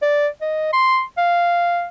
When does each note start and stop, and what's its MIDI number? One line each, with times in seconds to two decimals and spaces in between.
0.02 0.28 74
0.41 0.68 75
0.73 1.02 84
1.18 1.87 77